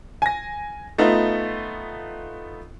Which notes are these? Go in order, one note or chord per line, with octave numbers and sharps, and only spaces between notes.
G#5 A#6
A3 B3 D#4 F4